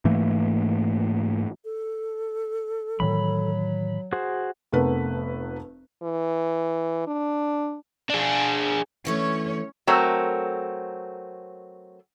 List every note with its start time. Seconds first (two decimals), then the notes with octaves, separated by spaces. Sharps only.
0.05 G#2 E3 A3 A#3
1.64 A4
3.00 A2 D#3 E3 F#3 B5
4.13 F#4 G#4 C5
4.72 F1 F2 A3 B3 A#4 B4
6.03 E3
7.07 D4
8.10 D4 G#4
9.05 D3 E3 A3 C#4 C#5
9.87 F#3 A3 C4 A#4 C#5